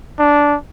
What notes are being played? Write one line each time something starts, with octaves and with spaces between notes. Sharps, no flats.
D4